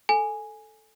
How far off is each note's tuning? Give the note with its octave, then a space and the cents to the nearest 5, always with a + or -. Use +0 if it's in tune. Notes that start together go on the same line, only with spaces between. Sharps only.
A4 +0 G#5 +0